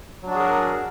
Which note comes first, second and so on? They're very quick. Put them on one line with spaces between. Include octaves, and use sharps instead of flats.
F#3 D4 F#4 G#4 A#4